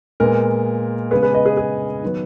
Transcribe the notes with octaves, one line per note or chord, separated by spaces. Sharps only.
A#2 G#3 B3 A#4
C#3 G#3 B3 G#4 B4
G#4 B4
B4 D#5
G#4 B4
G#4
D#3 F#3 B3